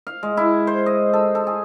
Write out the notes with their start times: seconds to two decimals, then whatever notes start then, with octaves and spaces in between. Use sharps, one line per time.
0.07 F5
0.23 G#3
0.37 E4
0.67 C5
0.86 D#5
1.13 A4
1.35 A4
1.47 G#4